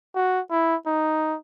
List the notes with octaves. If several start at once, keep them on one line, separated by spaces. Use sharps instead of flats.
F#4
E4
D#4